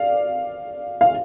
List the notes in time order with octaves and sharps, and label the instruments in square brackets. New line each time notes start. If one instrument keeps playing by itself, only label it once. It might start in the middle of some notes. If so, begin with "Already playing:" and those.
Already playing: [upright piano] D5 F5
F5